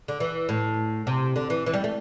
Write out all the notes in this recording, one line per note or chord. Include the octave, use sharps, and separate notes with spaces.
D3
E3
A2
C3
D3
E3
E3
G3
A3